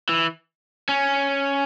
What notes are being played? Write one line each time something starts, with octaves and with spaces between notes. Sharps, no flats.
E3
C#4